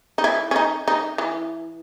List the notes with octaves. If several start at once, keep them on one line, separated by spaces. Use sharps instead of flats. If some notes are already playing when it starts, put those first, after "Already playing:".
D#4
E4
C#4
D#4
D#4
E3